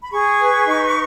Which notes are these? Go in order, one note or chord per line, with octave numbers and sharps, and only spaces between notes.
B5
G#4 C#6
B4
D#4